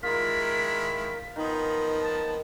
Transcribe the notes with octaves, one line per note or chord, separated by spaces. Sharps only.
D#3 G#3 E4 F4 A#4 B6
D#3 F3 B3 D#4
A5